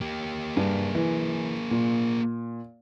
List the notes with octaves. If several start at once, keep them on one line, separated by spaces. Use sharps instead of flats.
A#3 G4
G2 A#3 G#4
E3
A#2